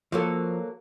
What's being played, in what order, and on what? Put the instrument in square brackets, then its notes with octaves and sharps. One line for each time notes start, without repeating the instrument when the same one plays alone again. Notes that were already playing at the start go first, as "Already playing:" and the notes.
[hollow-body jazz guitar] F3 [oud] F#3 A#3 A4